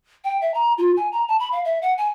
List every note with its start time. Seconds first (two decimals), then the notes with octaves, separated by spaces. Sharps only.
0.24 G5
0.42 E5
0.54 A#5
0.78 F4
0.97 G#5
1.12 A#5
1.28 A5
1.40 B5
1.52 F5
1.65 E5
1.82 F#5
1.98 G#5